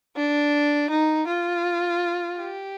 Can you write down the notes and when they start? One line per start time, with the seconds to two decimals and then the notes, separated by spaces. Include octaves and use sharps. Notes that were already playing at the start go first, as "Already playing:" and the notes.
0.16 D4
0.90 D#4
1.27 F4
2.38 G4